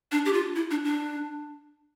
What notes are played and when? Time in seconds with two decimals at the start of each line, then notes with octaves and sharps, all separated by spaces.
0.12 D4
0.25 G4
0.33 F4
0.56 E4
0.71 D4
0.85 D4